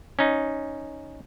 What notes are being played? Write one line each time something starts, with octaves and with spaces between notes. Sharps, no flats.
C#4 D#4